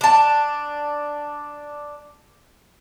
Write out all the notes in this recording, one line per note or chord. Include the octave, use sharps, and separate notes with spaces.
D4 A5